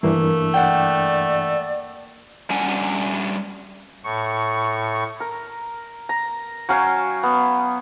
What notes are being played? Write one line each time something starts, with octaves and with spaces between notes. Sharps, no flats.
G2 E3 A3 A#3 D4
D5 F#5 G5
G3 C#4 D4 F#5 G#5
A2 C#6
A#4
A#5
F#3 C#4 F5 G5
B3